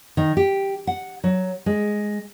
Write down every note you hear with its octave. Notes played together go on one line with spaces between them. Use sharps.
D#3
G4
F#5
F#3
G#3